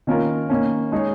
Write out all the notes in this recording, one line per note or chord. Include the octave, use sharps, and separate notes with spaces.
D#3 A#3 C#4 F4 A#4
D#3 A#3 C#4
G#3 D#4 G#4 C#5